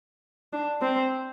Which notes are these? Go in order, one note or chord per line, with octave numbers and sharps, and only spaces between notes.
D4
C4